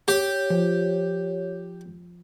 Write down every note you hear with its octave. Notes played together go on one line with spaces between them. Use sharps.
G4 C#5
F3